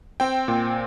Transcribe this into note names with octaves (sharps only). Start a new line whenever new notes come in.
C4 G5
A#2